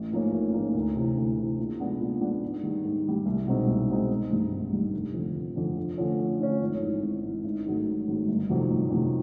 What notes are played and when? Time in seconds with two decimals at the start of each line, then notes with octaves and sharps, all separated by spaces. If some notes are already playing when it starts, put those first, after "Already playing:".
Already playing: A1
0.12 G#2 F3 A#3 C#4
0.32 A1
0.53 G#2 F3 A#3 C#4
0.75 D2
0.95 C3 E3
1.17 D2
1.37 C3 E3
1.58 A#2
1.79 F3 G#3 B3 D4
2.00 A#2
2.21 F3 G#3 B3 D4
2.43 G#2
2.63 D#3 G3
2.84 G#2
3.05 D#3 G3
3.26 C2
3.47 B2 G#3 C4 D#4
3.68 C2
3.89 B2 G#3 C4 D#4
4.10 G#1
4.31 G2 D#3 G3
4.52 G#1
4.73 G2 D#3 G3
4.93 F1
5.14 F2 D3
5.35 F1
5.56 F2 D3
5.77 F2
5.98 D3 F3 A3 C#4
6.19 F2
6.40 D3 F3 A3 C#4
6.61 G#1
6.82 G#2 E3
7.03 G#1
7.23 G#2 E3
7.44 G#1
7.65 G#2 D#3 F#3 A3
7.86 G#1
8.08 G#2 D#3 F#3 A3
8.28 G1
8.49 F2 C3 D#3 F#3
8.70 G1
8.91 F2 C3 D#3 F#3